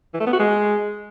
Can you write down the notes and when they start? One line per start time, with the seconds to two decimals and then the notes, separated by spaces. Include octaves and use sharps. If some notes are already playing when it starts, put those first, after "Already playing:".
0.14 E3
0.20 A3
0.27 B3
0.33 F#4
0.39 G#3